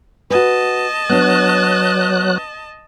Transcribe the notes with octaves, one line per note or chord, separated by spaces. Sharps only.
F#4 B4 D#5 A5
F#3 B3 D4 F#6